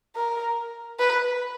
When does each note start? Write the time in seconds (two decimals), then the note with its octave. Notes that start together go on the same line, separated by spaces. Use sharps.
0.16 A#4
0.99 B4